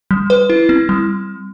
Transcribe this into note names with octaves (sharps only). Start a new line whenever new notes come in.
G3
B4
E4
C4
G3